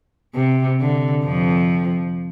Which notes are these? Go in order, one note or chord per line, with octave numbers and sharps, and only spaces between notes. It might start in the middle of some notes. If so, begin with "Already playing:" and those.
C3
D3
F2 F3